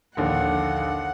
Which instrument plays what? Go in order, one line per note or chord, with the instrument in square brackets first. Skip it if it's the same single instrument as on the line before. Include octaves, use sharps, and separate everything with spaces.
[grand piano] A#1 D#2 D3 [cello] F#5